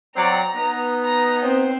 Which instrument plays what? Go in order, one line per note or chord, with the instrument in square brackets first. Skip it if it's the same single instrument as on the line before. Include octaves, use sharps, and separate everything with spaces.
[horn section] F#3 C4 D5 [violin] A#5
[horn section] B3 D#4
[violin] A#5
C4 C5